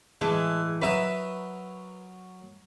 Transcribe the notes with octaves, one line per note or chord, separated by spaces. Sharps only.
A2 E3 G#3
F#3 A#4 B4 E5 D#6